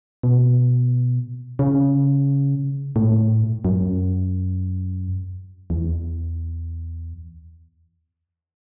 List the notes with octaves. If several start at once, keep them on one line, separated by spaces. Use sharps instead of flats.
B2
C#3
A2
F#2
E2